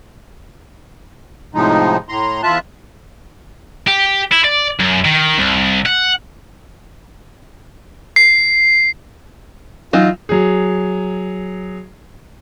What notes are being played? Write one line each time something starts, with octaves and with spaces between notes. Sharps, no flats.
A2 C3 F3 G#3 D#4
A2 A#5 C6
E2 F4 E5 A5 F#6
G4
E4
D5
F#2
D#3
C2
F#5
C7
E3 F#3 D#4 F4
F#3 G#4